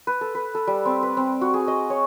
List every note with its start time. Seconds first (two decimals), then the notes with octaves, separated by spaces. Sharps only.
0.07 B4
0.21 A4
0.35 B4
0.55 A4
0.67 G3
0.85 C4
1.03 B4
1.17 C4
1.41 F#4
1.54 G#4
1.68 D#5
1.90 C#5